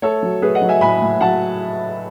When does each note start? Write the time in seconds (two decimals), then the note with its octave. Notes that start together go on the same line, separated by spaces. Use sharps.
0.02 A3 A4 C#5
0.23 F#3
0.42 A3 G#4 B4
0.55 D#5 F#5
0.62 F#3
0.69 E5 G#5
0.81 A2 G#5 B5
1.02 A2
1.21 F#3 F#5 A5